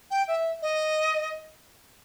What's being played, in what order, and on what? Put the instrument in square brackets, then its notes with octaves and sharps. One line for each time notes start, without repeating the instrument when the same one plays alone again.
[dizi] G5
E5
D#5